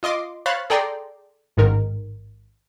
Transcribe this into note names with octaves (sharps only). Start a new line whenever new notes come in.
F4 D#5 C6 D6
C5 C#5 F5 B5 F#6 A6
G#4 A4 D5 G5 A#5 C6
A1 G#2 D#3 A#4